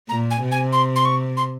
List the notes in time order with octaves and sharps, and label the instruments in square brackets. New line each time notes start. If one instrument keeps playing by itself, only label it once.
[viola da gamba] A#2 [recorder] A#5
[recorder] G#5
[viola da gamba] C3
[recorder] G#5
C6
C6
C#6
C6